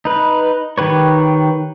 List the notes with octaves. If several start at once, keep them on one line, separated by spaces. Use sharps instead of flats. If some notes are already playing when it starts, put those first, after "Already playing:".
D#4 B4
D#3 G4 B4 C#5